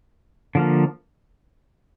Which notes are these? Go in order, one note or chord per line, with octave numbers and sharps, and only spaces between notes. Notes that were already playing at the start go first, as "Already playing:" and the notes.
D3 F3 A#3